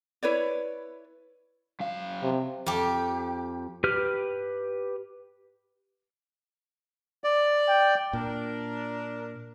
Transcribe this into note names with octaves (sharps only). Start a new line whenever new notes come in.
E4 B4 C#5 D5
F#2 F5
C3
F2 G4
G4 B4 F6
D5
G5
A#2 D4 A#4